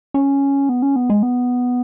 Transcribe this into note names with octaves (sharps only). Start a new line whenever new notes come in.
C#4
B3
C#4
B3
G#3
B3